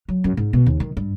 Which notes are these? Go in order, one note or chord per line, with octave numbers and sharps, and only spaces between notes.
F#3
F#2
G#2
B2
D#2
D#3
G2